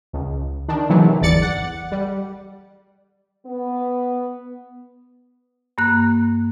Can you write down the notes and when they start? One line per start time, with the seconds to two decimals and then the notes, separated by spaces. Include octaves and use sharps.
0.13 C#2
0.68 D#3 D4
0.89 C3 D#3 E3 F#3 A3
1.21 G1 E2 D5 A6 C#7
1.42 F#5
1.92 G3
3.46 B3
5.78 G2 A#3 F#6